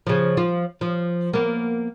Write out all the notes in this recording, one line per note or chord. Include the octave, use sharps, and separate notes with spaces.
C#3 F3
F3 F4
F3
A#3 B3